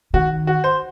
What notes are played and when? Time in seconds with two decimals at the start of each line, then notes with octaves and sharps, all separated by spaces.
0.14 D#3 F#4
0.47 F#4
0.64 C5